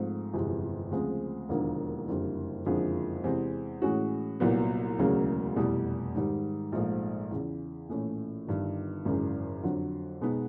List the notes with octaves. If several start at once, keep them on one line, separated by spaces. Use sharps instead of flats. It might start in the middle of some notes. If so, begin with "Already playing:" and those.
Already playing: G#2 F3 A3 C4
G1 F2 C3 E3 G#3
D2 C#3 F3 G#3 C4
E1 D#2 D3 F3 A#3
F#1 F2 D3 G3
F#1 F2 D3 F3 G#3
E2 C3 E3 G#3 C4
A2 E3 G#3 C#4 F#4
C2 A#2 F#3 B3
E1 D2 C#3 F#3 A#3
F1 E2 B2 G3
G#2 D#3 G3
A#1 G#2 F3 A3
E2 C#3 E3
A#1 A2 E3 A3 C#4
G1 G2 D#3
G#1 F#2 C#3 E3
F2 D3 F#3
B2 G#3 B3 D#4